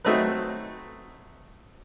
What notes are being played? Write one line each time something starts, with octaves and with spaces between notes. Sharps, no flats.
F#3 A3 C4 D#4 B4